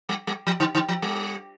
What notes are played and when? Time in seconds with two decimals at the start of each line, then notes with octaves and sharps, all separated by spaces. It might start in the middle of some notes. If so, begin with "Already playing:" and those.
0.09 G3
0.27 G3
0.47 F3
0.60 D3
0.75 D3
0.89 F3
1.02 G3